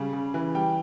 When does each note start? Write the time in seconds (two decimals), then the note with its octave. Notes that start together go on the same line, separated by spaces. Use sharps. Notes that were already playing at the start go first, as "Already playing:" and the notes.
Already playing: C#3 G3
0.13 C#3
0.34 E3
0.55 G3 G5